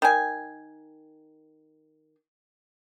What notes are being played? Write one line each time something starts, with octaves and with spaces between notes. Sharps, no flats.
D#3 G#5